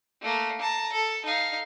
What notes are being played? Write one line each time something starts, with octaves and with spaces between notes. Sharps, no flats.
A3 A#3
A5 A#5
A4
D#4 F5